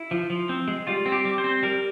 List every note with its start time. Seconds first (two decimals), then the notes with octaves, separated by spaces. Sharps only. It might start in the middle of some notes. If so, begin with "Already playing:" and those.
Already playing: E4
0.11 F3
0.30 F3
0.49 C4
0.68 G#3
0.87 G3 F4
1.06 C4
1.12 G4
1.25 G3
1.38 C5
1.44 C4
1.63 G3 A#4